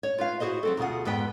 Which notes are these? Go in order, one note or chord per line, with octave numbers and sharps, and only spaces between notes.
C#5
F4 B4 F5
E4 F#4 G#4 C5 D#5
F#3 C4 A4
D2 B2 F4 G#4 F#5
F2 G#2 B3 B4 G5